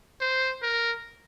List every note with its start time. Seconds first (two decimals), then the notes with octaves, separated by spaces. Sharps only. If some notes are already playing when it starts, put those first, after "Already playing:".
0.21 C5
0.63 A#4